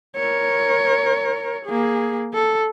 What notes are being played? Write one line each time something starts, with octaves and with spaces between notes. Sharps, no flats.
A#4 C#5
A#3 G#4
A4